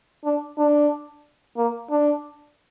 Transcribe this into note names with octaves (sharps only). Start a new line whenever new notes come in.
D4
D4
A#3
D4